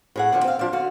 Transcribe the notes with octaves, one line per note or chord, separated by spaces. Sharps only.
A2 G#4 F#5
D3 F3 G3
C4 F5
F3 D4
D3 F#4 F5